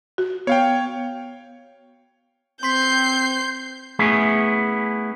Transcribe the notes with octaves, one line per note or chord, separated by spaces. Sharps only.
F#4
B3 C#5 F5 G5
C4 C6 G6 B6 C7
A3 B3 C#4 E4 G#4